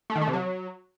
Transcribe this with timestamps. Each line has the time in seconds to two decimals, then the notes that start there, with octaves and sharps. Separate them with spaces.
0.10 A3
0.16 D#3
0.21 A3
0.27 C3
0.33 F#3